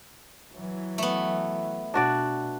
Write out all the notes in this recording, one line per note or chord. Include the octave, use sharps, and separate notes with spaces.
E3 F#3
A3 B3
B2 D4 F#4 D5